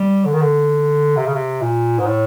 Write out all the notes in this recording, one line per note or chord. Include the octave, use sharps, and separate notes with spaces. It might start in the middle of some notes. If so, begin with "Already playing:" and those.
Already playing: G3
D3
D#3
D3
C3
C#3
C3
A#2
G#2
A2